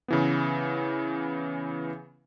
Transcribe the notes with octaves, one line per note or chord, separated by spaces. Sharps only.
C#3 E3 B3